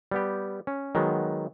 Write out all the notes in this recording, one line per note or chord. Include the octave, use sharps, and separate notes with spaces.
G3 B3 G4
C#4
D#3 F#3 G#3 B3